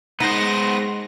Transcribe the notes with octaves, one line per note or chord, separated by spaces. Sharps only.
G#3 B3 D#4 C5 F#5 A#6